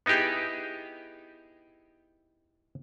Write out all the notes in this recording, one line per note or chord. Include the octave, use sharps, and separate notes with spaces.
B3 D#4 E4 G4 G#4